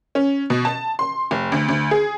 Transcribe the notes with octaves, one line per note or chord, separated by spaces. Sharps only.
C#4
B2
A5
C6
F1
D2
D2
G#4